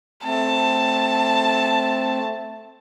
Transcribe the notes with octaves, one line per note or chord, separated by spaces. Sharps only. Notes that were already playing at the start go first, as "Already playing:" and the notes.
A3 C4 A5